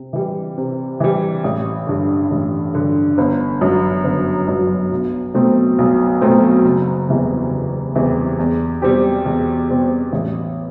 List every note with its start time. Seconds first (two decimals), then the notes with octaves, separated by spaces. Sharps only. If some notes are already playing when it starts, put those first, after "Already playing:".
Already playing: C3
0.13 E3 G3
0.58 C3
1.00 E3 G3
1.44 A1
1.87 G2 D3
2.31 A1
2.74 G2 D3
3.18 G1
3.61 F#2 F#3
4.04 G1
4.48 F#2 F#3
4.91 B1
5.34 B2 F#3 A3 C4
5.78 B1
6.21 B2 F#3 A3 C4
6.65 F#1
7.08 E2 C3 E3 G3
7.51 F#1
7.96 E2 C3 E3 G3
8.39 E2
8.82 B2 G3 C4 G4
9.26 E2
9.69 B2 G3 C4 G4
10.13 A1